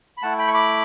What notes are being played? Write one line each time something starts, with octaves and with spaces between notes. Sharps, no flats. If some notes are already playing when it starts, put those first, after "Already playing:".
B5
A3 E4 F#5 A5
G5 B5
C#6
B5 D6